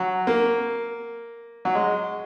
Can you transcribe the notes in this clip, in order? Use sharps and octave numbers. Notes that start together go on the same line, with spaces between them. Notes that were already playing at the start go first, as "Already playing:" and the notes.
Already playing: F#3
A#3
F#3
G#3